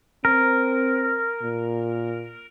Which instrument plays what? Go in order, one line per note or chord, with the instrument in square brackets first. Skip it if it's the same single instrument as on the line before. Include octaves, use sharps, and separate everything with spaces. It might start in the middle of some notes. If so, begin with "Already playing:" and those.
[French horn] C4 [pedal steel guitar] A#4
[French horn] A#2